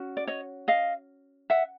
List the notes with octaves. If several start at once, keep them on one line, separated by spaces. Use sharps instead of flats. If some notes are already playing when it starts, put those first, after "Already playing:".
Already playing: C#4 F#4
D5
C#5 D#5
D#5 F5
E5 F#5